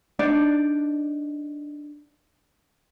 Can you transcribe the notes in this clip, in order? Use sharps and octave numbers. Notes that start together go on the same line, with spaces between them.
D4 D#4 D5